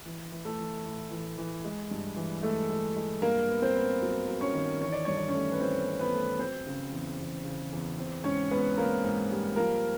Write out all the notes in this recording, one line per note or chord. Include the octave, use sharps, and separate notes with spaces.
E3
E3
A3 A4
E3
A2
E3
E3
G#3
G2
E3
G#3 A3 A4
G#3
G#3
G2 A#3 A#4
B3
C4 C5
B3
F#3
F#3
C#4 C#5
D#3
E3 C#5
D5
G2 C#5
D5
C#4 C#5
A3
B4
E3 C4 C5
C4
B3 B4
A3
F#3 C4 C5
C#3
E2
E2
C#3
E2
C4
G#2 C#4 C#5
G#2 B3 B4
A#3 C4 A#4
G#2
G3
F3 A#3 A#4